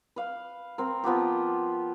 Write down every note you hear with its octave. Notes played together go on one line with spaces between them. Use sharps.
B4 F5
C4 A#4
F3 B3 F4 G4